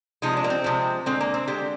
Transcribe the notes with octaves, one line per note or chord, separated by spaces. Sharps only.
C3 F3 G#3 D#4
D4
A#3
C4
C3 F3 G#3
D3 G#3 C4
A#3
C4
D3 G#3 G4